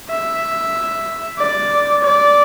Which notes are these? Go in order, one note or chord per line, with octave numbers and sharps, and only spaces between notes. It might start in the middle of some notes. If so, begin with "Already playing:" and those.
E5
D5
D5